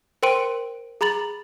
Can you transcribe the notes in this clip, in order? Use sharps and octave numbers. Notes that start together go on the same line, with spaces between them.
A#4 C5 G5 C6 D7 D#7
G#4 A#5 B5 A6 F#7